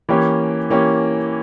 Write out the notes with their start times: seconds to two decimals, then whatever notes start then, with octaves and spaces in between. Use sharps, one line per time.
0.09 E3 A#3 C#4 G4
0.70 E3 A#3 C#4 G4